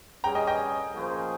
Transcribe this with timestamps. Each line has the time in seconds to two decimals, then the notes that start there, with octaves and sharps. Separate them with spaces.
0.24 G3 C#4 G#4 G5 A#5
0.35 D#5 G5
0.47 D#5 G5
0.94 F3 A#3 C#4 G#4 C5